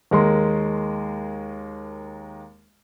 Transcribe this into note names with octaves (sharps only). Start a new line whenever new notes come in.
D#2 G#3 A#4 C6